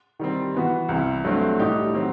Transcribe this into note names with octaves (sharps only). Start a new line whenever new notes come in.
D#3 G3 C4
E3 B3 F#4
C2 C3 E3
G2 F#3 A3 C4
A2 G3 D#4 G4
D#3 F#3 C4